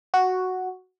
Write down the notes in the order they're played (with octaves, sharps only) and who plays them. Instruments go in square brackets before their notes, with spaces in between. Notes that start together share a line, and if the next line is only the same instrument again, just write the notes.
[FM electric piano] F#4